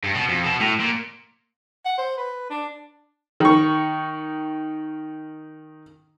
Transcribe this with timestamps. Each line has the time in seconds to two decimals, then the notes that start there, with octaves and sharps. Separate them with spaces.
0.04 G2
0.15 B2
0.29 F2
0.44 B2
0.61 A2
0.80 A#2
1.85 F#5
1.98 C5
2.18 B4
2.50 D4
3.40 D#3 C#6